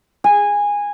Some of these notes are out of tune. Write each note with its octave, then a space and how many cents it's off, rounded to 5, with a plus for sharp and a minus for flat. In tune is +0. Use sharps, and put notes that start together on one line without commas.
G#5 -15